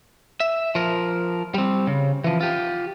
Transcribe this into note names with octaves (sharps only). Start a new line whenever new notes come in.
E5
F3 A#4
G3 C4
C#3
E3 F3
F4 G4